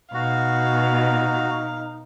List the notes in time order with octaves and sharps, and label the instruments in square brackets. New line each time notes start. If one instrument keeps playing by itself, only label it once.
[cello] B2 [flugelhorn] D#4 [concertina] F#4 [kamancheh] F5